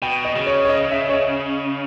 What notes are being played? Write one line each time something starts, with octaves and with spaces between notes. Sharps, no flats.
B2 G5
D#5
C#3
C#5
C#5
D#5
E5
C#5
D#5